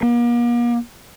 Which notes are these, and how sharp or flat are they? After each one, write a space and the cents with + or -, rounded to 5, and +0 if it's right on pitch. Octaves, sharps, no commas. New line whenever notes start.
A#3 +40